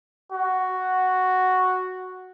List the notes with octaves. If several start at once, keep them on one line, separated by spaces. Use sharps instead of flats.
F#4